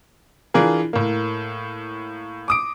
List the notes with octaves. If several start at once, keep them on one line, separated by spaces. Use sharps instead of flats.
E3 D4 F4 G#4 A#4
A2 A#3
D6 D#6 D7